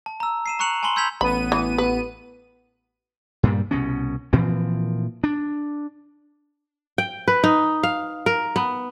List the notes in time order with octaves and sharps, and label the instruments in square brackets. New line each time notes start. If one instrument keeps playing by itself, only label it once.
[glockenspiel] A5
A#5 E6
C7 D#7 E7
A#5 C#6 F#6 C#7 F7 F#7
G#5 A5 B5 C6 F#7 G7
C6 E6 G6 G#6 B6 F7
[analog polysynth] A1 B3 D#7 [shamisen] B5
[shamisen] E3
B4
[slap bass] G2 A#2 G3
C2 B2 C#4
A#2 E3 F3 C4
D4
[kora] G5
B4
D#4
F5
A#4
B3